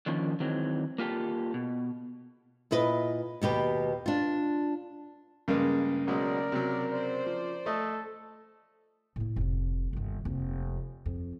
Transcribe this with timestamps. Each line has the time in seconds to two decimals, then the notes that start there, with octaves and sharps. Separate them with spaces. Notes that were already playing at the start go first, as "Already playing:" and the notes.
0.06 D3 D#3 F3 A#3 C#4
0.40 D#3 E3 F#3 G#3 C4
0.98 A#3 F4 G4 A4
1.54 B2
2.71 A#2 E4 B4 D#5
3.42 D#2 B2 G4 B4
4.06 D4 F4
5.48 G2 C#3 G#3 A#3
6.07 B1 F#3 G#3 A#4 D5
6.52 C3 F#3
6.92 C5 D5
7.26 F3
7.66 A3 A4 D#5
9.16 A2 A#3
9.36 F1 D3
9.93 G1 D#2
10.25 F1 A#3
11.06 F2